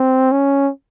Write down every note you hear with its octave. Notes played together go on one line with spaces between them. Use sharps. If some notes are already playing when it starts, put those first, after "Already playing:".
Already playing: C4
C#4